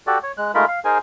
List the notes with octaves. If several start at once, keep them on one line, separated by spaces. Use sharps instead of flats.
F#4 G4 A4 D5
C#5
G#3 F#6
G#3 A3 D#4 F4 A#4 B5
F5
D#4 G#4 A#4 C5 G#5